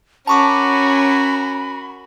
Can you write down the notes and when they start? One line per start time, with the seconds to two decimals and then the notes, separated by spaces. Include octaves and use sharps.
0.27 C#4 F#4 A#4 A5 B5 C#6 D6